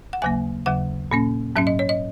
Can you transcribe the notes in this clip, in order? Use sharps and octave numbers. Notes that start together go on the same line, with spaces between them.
F#5
D#2 C#3 F#3 A#3 G#5
D#2 C#3 F#3 F#5
A#2 A#3 C#4
G#2 F#3 C#4 E5
D#5
C#5
D#5